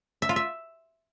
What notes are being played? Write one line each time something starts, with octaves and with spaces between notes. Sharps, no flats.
E5
F4
E5